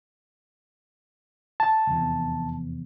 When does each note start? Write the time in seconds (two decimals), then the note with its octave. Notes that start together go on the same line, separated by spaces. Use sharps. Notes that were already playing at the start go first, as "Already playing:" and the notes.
1.60 A5
1.87 F1 E2